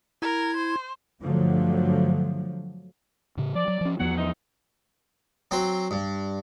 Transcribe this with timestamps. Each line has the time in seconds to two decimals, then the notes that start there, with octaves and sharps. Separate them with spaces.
0.22 E4 A#4 G#6
0.57 C5
1.22 G2 D3 F3 F#3 A3
3.37 A2 C#3
3.55 F3 D5
3.68 F#3
3.81 F3 C#4
3.99 E2 F3 F#3 B3 F#5
4.17 G#2 E3 D#4
5.51 F#3 C4 C5
5.91 G2